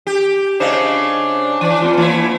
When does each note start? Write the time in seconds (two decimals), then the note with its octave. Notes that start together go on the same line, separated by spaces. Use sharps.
0.07 G4
0.60 C#3 D4 D#4 C5 E5 F5
1.61 E3 G#5
1.82 B3 C4 F4
1.97 E3 A#3 B3 E4 C#5